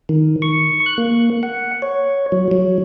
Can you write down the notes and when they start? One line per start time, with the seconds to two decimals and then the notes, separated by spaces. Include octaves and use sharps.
0.09 D#3
0.42 C#6
0.86 F#6
0.98 A#3
1.43 F#5
1.82 C#5
2.32 F#3
2.51 F#3